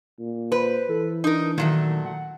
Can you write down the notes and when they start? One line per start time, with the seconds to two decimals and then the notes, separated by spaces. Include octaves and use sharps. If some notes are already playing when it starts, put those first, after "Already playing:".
0.19 A#2
0.52 B4 C5
0.89 E3 A4
1.24 D4 D#4 A#4
1.58 A#2 D#3 F#3 A3
2.05 F#5